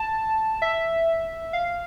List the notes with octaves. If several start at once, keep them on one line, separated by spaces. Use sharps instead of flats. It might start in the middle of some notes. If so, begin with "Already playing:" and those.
Already playing: A5
E5
F5